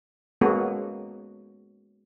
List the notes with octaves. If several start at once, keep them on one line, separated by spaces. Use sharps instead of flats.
G#3 A#3 B3 C#4 F#4 A4